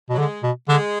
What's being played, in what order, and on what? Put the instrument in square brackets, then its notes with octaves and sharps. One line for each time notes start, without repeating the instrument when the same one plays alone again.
[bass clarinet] B2
[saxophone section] F#3
[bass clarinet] D3 [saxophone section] G#3
[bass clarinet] B2
[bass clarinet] D3 [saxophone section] G#3